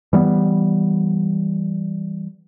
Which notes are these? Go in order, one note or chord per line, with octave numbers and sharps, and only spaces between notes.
E3 G3 A3 B3